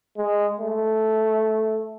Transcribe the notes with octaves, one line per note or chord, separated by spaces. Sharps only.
G#3
A3